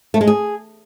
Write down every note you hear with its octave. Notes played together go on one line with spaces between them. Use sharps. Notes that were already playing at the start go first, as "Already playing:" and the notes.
A3
G#3
G#4